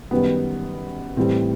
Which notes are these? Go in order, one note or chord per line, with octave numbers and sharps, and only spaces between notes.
F#2 D#3 G3 B3
A2 E3 G3 C4